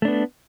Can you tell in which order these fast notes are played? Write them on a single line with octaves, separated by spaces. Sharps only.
A3 D4 B3